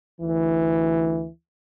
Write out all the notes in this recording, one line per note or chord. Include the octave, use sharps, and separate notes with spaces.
D2 E3